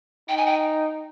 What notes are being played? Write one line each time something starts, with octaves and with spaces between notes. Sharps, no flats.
D#4 G5
G#5
G5